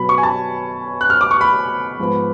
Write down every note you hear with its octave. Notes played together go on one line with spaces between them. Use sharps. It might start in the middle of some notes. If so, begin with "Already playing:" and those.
Already playing: B2 F#3 B3 B5
C#6
G#5
A5
F#6
F6
D6
C#6
B5
G#2 F3 B3